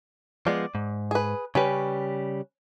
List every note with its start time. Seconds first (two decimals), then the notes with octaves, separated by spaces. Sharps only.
0.47 F3 G#3 B3 D5
0.75 G#2
1.11 G#4 B4
1.55 C#3 G3 C#4 G4 B4